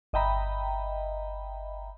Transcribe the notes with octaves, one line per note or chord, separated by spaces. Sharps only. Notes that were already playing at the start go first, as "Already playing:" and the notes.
G1 D#5 E5 G5 A#5 B5